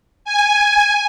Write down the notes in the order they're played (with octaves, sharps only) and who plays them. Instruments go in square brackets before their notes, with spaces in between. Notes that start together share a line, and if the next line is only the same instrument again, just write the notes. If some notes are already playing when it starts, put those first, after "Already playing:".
[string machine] G#5